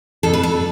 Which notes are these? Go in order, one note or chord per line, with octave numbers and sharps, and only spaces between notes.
F2 A4
B4
A4